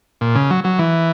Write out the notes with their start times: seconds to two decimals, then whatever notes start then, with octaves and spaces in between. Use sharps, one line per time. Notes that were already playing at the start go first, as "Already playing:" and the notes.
0.21 A#2
0.35 C#3
0.51 F#3
0.64 F#3
0.79 E3